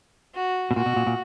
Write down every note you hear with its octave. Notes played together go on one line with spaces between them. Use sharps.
F#4
B2
A#2 F#4
B2
A#2
A#2